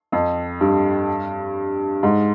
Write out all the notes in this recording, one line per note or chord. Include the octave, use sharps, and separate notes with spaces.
F2
G2
G#2